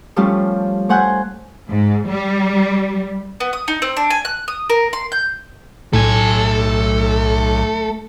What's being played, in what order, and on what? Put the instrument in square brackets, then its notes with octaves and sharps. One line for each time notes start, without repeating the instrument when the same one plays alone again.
[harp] F3 G3 A3 C#4 F4
A3 C5 F#5 G#5 F#6 G6
[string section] G#2
G3
[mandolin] B3
D#6
D#4
C4
D4
G#5
F#6
D#6
A#4
C6
G6
[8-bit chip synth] B1 [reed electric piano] A2 [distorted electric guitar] A3 G#5 [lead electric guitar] A4